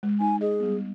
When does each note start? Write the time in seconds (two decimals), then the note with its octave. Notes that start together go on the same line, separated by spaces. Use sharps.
0.03 G#3
0.20 D#4 G#5
0.41 G#4 D#5
0.60 G3 B3